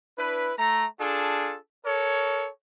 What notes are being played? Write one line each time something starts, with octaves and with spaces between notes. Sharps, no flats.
D4 E4 B4
A3 A#5
D4 F4 G#4 A4
A4 A#4 C#5